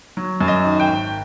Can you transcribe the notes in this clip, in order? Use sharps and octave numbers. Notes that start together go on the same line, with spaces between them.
F#3
F#2
D#5
D#3
G5
G#1